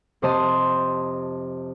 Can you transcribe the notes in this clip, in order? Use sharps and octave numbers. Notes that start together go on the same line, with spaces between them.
F2 C3 C5 D#5 A5 C6